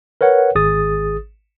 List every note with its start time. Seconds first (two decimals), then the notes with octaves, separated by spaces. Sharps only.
0.21 A#4 B4 C#5 F#5
0.55 G#1 G#4 D#6 A6